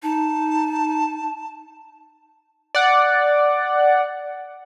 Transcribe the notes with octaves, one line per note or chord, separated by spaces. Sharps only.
D#4 A5
D5 F#5